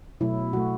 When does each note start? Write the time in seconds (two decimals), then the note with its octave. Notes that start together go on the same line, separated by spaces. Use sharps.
0.20 B2 F#3 A3 E4
0.53 B2 F#3 A3 F#4